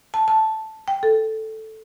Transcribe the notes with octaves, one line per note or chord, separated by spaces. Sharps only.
A5
A5
G5
A4